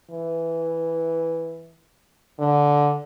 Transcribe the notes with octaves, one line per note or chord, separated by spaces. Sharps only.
E3
D3